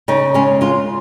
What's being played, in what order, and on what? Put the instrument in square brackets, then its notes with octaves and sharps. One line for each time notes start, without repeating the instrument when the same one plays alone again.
[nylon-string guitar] C#3 D#4
G#3 C#4
G#3 F4